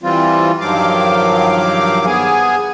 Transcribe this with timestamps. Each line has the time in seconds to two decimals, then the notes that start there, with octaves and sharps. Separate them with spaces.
0.03 E3 G3 C4 F4
0.61 G2 D#3 F3 F#3 F5 D6
2.06 B3 G#4 G#5